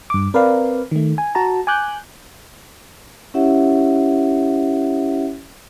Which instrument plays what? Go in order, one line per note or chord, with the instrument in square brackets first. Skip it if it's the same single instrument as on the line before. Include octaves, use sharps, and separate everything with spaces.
[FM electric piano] G2 D6
C4 A#4 B4 D5 F5
D#3 A3
G#5
F#4 A5 A#5
G#5 D6 F#6 G6
[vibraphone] C#4 E4 G4 C#5 E5 F#5